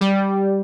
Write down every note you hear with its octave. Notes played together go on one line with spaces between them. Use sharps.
G3